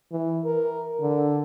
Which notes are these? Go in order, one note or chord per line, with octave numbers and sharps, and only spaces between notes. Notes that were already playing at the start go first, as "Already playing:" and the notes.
E3
A#4
D3